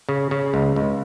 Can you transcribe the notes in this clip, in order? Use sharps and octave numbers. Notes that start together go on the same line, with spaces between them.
C#3
C#3
C#2
C#2